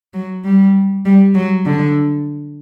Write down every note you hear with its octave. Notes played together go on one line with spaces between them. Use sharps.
F#3
G3
G3
F#3
D3